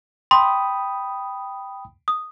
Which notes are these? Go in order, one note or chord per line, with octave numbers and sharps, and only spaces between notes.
G5 B5 C6 D#6
D#6